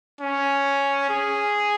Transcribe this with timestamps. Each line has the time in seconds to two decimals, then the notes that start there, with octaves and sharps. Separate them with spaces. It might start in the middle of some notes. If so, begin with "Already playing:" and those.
0.21 C#4
1.09 G#4